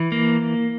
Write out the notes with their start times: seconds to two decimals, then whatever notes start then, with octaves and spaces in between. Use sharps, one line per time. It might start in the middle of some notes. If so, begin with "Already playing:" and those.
Already playing: E3
0.12 A#3